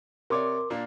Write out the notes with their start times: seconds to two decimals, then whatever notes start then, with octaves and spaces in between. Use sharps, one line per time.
0.30 C3 A#4 C#5 D5 C6 D6
0.70 A#2 A#3 D4